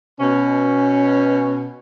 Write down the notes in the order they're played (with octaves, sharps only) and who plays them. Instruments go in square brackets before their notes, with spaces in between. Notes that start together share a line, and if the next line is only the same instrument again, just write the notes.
[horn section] B2 C#4